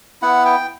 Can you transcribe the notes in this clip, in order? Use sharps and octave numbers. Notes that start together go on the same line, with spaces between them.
B3 E4 F#5
G5